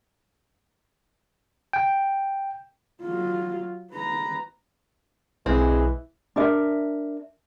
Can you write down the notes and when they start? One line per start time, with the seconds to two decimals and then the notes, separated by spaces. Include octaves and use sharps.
1.73 G5
3.02 F#3 F4
3.92 B4 A#5
5.46 B1 E3 G#3 C4
6.36 D4 A#4 E5